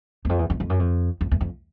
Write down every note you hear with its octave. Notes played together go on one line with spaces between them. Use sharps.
E2
F2
E2
F2
F2
F#2
F2
F2
E2
F2